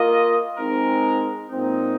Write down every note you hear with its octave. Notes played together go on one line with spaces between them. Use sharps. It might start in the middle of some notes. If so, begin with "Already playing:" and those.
Already playing: A#3 F4 A#4 D#5
G#3 C4 D#4 A#4
A#2 G#3 C4 D#4